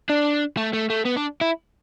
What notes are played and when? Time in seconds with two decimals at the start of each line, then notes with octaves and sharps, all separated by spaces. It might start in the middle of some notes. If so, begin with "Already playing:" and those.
0.10 D4
0.57 A3
0.73 A3
0.90 A3
1.05 B3
1.16 D4
1.41 E4